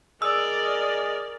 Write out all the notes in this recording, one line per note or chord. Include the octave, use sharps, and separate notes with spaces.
G#4 A#4 D5 D#5 E6